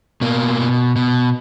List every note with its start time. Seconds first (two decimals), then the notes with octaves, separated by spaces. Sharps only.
0.21 B2 A#3
0.59 B2
0.96 B2